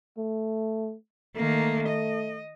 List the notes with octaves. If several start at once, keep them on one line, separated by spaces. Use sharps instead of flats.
A3
D#3 A3 A#3
D#5